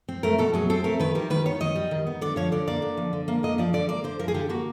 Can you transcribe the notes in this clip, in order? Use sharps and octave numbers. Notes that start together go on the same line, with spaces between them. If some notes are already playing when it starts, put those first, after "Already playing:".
C4
A3 A#4
B2 A4
F#3 G#4
C4 A4
A3 A#4
D#3 B4
G3 A#4
D#3 B4
B3 C#5
D#3 D#5
G3
D#3
B3
D3 D5
F3 C#5
D3 D5
A#3 D5
D3
F3
D3
A#3
D3 D#5
F3 D5
D3 D5
A#3 D5
D3 C5
F3 A#4
G#4
D3 G4
A#3 F#4